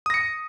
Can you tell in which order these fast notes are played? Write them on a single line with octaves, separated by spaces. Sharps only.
D#6 A#6 C#7